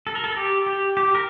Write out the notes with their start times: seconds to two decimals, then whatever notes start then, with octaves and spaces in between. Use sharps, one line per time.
0.07 A4
0.15 A#4
0.24 A4
0.37 G4
0.66 G4
0.97 G4
1.15 A#4